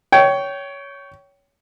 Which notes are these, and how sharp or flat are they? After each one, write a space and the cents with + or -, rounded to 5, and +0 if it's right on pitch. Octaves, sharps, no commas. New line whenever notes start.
C#5 +15 G5 -20